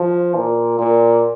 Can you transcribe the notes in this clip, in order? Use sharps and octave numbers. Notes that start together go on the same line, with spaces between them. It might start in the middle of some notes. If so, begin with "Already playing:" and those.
Already playing: F3
A#2
A#2